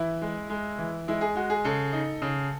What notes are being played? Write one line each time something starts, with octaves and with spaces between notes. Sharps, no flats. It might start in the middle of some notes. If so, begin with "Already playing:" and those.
Already playing: E3 E4
G#3
G#3
E3
G#3 E4
G#4
G#3 F#4
G#4
C#3 A4
D#4
C#3